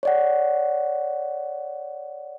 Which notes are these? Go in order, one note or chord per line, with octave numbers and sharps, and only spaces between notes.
C#5 D5 F#5